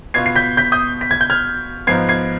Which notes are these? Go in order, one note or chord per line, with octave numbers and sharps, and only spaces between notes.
B2 B3 F4 G#6 C7
C7
G6 B6
G6 B6
D#6 G6
B6
G#6
G6
F6 G#6
G#2 F3 B3 G#6 C7
G#6 C7